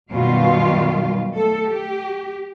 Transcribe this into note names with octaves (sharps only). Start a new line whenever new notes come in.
F#2 B2 D#3 G3 F4 F5
A3 A4
G4